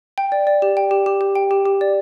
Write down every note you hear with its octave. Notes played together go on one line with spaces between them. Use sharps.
G5
D5
D5
G4
G5
G4
G4
G4
G5
G4
G4
D5